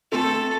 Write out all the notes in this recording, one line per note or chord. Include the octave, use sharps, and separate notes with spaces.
A3 C4 A4